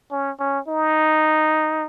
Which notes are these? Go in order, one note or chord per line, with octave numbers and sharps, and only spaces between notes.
C#4
C#4
D#4